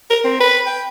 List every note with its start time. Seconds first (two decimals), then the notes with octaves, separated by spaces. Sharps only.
0.10 A#4
0.25 C4
0.41 B4
0.67 G5